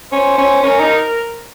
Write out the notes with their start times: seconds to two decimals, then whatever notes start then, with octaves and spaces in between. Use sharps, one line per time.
0.12 C#4 C5
0.38 C#4
0.63 C#4 A#4
0.80 D#4